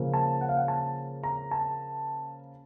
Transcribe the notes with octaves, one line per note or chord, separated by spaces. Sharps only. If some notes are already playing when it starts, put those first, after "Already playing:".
Already playing: C#3 F3 A#3 C#4
A5
F#5
F5
F#5
A5
A#5
A5